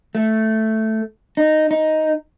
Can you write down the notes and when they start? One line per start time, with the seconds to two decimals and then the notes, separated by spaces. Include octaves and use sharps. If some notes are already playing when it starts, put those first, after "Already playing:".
0.15 A3
1.37 D#4
1.71 D#4